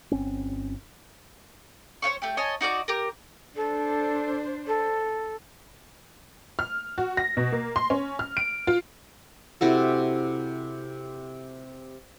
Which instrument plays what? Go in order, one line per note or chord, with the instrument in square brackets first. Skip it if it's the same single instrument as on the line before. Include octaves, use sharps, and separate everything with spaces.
[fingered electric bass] G1 C4 C#4
[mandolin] C5 C#5 F5 C#6
A3 G4 G5
C#5 D#5 G#5 A5
D#4 F#4 D5 D6
G4 A#4
[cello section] D4 C5 [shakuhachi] A4
[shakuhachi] A4
[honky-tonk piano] F6
F#4
A#6
B2
A#3
C6
C#4
F6
D7
F4
[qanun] C3 E4 F#4 A4